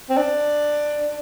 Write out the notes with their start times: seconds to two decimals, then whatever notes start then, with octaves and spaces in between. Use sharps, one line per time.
0.10 C4
0.17 D4